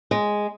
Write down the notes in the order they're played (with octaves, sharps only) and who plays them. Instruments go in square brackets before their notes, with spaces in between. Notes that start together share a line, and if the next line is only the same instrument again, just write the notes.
[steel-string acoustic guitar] G#3